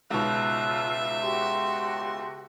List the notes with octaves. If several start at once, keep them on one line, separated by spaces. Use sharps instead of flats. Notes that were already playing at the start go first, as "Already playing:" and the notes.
C#2 G#2 B2 F4 E5 E6 F#6
F#4 G4 C6